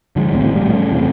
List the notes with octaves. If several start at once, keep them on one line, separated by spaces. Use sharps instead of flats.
D3 F3 G#3
A#1 D#2 A2 C4
A1
A#1 A2 G3
A2 C#3
E2 C3